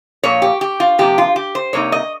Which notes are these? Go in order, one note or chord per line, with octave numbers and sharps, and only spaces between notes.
A#2 F3 A#3 C#5
G4
G4
F4
C3 F3 A#3 G4
F4
G4
C5
C3 G3 A#3 D#4 C#5
D#5